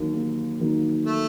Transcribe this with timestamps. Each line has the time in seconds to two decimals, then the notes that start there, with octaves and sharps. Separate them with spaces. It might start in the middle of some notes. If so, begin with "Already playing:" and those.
Already playing: D#2 D#3 F#3 A#3 D#4
0.13 D#2
0.59 D#3 F#3 A#3 D#4
1.05 A3